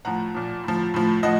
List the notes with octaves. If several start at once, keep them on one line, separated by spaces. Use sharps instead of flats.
A2 F3 F#5 A#5
A#2 F3
A2 F3
A2 F3
A2 F3 D#5 F#5